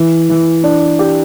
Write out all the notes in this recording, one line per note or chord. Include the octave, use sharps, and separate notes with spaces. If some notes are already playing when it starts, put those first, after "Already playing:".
Already playing: E3
E3
D4
G4